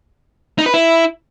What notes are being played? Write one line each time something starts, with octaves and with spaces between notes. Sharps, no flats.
D#4
B4
E4